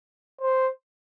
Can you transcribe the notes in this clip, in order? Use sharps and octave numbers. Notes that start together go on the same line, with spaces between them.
C5